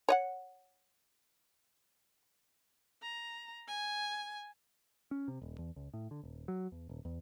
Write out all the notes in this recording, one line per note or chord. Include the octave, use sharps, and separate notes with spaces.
C#5 D#5 F#5
A#5
G#5
C#4
C3
D#1
E2
C#2
A2
D3
D#1
F#3
E2
D#1
E2